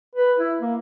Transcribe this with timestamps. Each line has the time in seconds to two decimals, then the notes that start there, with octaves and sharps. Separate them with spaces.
0.15 B4
0.38 E4
0.60 A#3